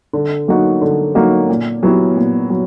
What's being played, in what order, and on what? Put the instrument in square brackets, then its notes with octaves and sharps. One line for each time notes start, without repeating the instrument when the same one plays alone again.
[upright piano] D3
F#3 A#3 D#4 F#4
D3
F#3 A#3 D#4 F#4
A#2
F#3 B3 E4 G4
A#2
F#3